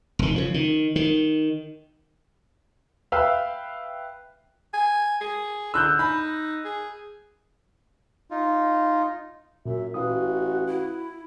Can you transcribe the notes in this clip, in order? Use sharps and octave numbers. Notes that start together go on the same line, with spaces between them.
F1 D#3
C#3 F3
D#3
D#3
B4 E5 F5 G5 B5 E6
G#5
G#4
D3 E6 F#6 G6
D#4 B5
G#4
D#4 F4
F#2 A#2 E5
A1 F#4 B4 F5 D#6
E4